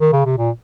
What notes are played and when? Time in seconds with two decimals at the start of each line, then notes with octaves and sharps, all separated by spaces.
0.00 D#3
0.13 C#3
0.25 C3
0.37 A#2